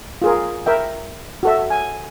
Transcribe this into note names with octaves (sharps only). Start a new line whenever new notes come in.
F4 G#4 A#4
A#4 E5 G5
F#4 A4 E5
G#5